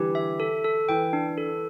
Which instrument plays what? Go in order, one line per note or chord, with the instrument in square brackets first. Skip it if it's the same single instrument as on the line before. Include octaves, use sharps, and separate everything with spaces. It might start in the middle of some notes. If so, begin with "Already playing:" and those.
Already playing: [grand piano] D3 E3 G3 [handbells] G4
[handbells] E5
A4
A4
[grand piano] E3 [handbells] G5
[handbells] D4
A4